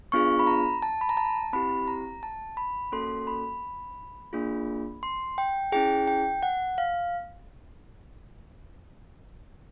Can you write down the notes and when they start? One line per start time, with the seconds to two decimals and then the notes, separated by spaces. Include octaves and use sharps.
0.12 B3 D4 F4 G#4 C#6
0.39 B5
0.47 A#5
0.82 A5
1.01 B5
1.09 A#5
1.17 A5
1.53 C4 E4 G4 B5
1.88 A#5
2.23 A5
2.57 B5
2.92 A#3 C#4 F#4 A4 C6
3.27 B5
4.33 A#3 D4 F4 G#4
5.03 C6
5.38 G5
5.72 C#4 E4 G#4 G5
6.07 G5
6.43 F#5
6.78 F5